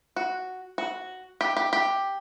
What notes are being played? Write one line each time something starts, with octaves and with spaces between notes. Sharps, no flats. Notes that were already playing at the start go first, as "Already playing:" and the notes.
F#4
F#4
G4
G4
G4